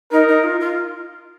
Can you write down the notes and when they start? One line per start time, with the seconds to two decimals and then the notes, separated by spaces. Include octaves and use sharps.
0.12 D#4 A#4
0.28 D#4
0.44 F4
0.60 F4